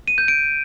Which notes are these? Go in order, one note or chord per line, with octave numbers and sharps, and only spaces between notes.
D#7
G6
D7